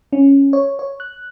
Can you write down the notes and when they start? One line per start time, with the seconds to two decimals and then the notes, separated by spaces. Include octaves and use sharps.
0.13 C#4
0.53 C#5
0.79 C#5
1.00 F#6